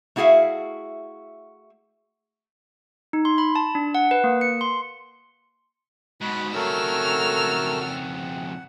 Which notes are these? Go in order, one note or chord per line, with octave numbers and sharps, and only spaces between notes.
A3 E4 F#4 G#4 E5 F5
D#4
C6
B5
A5
D4
F#5
B4
A#3
C#7
C6
G#2 B2 F#4 B5 F#6
F2 C#3 F#3 A3 A4 A#4 E6 F6
F#5